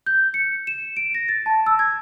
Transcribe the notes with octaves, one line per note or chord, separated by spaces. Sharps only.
G6
C#7
E7
D7
A#6
A6
A5
E6
G#6